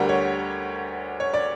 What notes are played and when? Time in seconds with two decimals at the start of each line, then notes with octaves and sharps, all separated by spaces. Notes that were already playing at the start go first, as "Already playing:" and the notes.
Already playing: D2 D3 G3 G4 A#4
0.09 C#5
1.20 C#5
1.34 D5